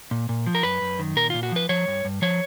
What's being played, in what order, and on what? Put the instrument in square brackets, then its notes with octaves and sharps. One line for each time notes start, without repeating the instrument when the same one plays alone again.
[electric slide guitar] A#2
A#2
F3
A#4
F#2 B4
F#2
D#3
A#2 A#4
A#2 F4
F#4
F3 B4
F3 C#5
G2
G2
F3 C#5